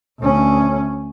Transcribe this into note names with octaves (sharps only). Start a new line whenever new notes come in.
D2 C#4